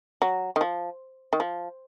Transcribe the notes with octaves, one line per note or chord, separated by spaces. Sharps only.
F#3
D#3
F3
D#3
F3